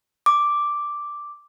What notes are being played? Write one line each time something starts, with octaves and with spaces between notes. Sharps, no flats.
D6